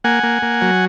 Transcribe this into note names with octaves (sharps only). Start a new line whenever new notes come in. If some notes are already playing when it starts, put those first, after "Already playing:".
A#3 F#5 G#5
A#3
A#3
F#3